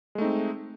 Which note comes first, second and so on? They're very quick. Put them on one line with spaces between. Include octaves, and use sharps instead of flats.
G#3 A3 D#4 C4